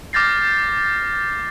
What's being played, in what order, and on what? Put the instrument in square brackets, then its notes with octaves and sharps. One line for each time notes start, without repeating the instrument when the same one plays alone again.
[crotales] D6 F6 G6 A6 A#6 C7